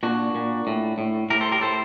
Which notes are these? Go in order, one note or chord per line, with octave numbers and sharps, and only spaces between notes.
A#2 D4 F#4
A#2
A2
A2
A2 G4 A#4
A4 C5
G4 A#4
A2 A4 C5